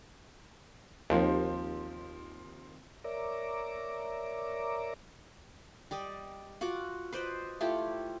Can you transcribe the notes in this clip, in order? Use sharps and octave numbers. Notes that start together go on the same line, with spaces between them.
D#2 F3 C4
A#4 C#5 D5 E5 A#5 D6
G3 D5 D#5
F4 F#4 F#5 D6
B4 C5 D5 D#5
A3 E4 F4 G4